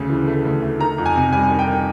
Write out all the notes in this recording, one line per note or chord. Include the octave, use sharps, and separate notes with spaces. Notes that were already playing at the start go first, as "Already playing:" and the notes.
Already playing: D2 C#3 A3
E3
A3
D2
A3
D#3 A#5
F2
G#5
C3
G3 G#5
D#3
G5
D#3